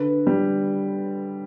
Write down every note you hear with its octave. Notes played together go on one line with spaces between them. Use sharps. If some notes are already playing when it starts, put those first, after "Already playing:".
Already playing: D3 B4
G3